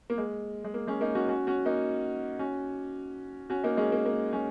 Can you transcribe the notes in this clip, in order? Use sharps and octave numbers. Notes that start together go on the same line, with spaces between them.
A#3
G#3
G#3
A#3
G#3 C#4
A#3 D#4
C#4 F#4
C#4 F#4
C#4 F#4
A#3 D#4
C#4 F#4
C#4 F#4
A#3 D#4
G#3 C#4
A#3
A#3
G#3 C#4